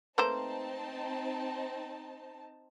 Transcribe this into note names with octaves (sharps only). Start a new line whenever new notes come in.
A3 A#3 C4 D#4 B4 C5 A5 E7